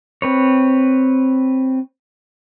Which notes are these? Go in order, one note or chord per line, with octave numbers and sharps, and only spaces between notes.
C4 B4 C#5